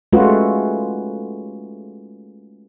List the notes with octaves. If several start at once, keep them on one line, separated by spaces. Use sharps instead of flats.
G#3 A3 C#4 F4 F#4 B4